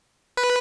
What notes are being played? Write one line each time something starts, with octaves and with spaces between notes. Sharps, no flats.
B4